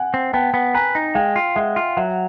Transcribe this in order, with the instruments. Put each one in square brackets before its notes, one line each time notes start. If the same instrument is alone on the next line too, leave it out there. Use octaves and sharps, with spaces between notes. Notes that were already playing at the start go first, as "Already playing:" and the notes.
Already playing: [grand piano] F#5 G#5
[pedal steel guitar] C4
[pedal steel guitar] B3 [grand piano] G5 A5
[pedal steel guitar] B3
[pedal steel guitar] B4 [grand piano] G#5 A#5
[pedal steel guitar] D#4
[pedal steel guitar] G#3 [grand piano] F5 G5
[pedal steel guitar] F4
[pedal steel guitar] G#3 [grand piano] E5 F#5
[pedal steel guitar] F4
[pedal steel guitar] F#3 [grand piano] E5 F#5